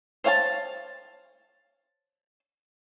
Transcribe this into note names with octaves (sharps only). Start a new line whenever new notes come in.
C5 C#5 F5 G5 A5